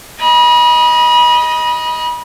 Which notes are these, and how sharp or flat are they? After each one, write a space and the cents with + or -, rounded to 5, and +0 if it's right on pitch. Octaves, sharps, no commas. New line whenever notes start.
D#5 +5 B5 -35